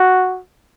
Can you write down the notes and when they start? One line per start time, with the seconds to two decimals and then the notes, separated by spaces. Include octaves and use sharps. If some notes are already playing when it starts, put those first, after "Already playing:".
Already playing: F#4